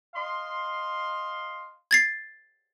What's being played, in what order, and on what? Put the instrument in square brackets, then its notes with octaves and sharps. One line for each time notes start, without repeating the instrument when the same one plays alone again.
[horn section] D#5 F5 C6
[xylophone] G#6 A6 C7